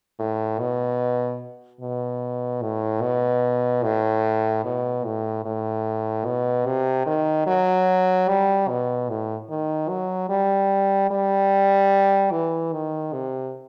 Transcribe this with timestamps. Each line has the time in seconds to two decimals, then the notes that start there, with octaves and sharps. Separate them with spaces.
0.19 A2
0.59 B2
1.81 B2
2.62 A2
3.02 B2
3.83 A2
4.64 B2
5.05 A2
5.45 A2
6.25 B2
6.66 C3
7.06 D#3
7.47 F#3
8.28 G3
8.68 B2
9.09 A2
9.49 D#3
9.89 F#3
10.29 G3
11.10 G3
12.31 E3
12.72 D#3
13.13 C3